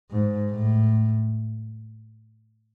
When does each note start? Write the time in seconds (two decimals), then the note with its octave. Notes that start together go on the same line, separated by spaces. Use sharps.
0.11 G#2
0.52 A2